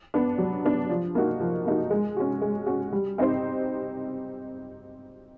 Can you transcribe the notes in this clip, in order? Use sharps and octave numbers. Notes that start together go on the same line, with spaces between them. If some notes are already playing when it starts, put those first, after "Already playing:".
B3 D4
F#3
B3 D4
F3
A#3 D#4 F#4
F3
A#3 D#4 F#4
G#3
C#4 F#4
G#3
C#4 F#4
G3
C4 D#4 G4 C5